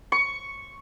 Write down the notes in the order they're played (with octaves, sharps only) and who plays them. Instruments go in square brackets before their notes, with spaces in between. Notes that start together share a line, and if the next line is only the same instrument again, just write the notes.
[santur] C#6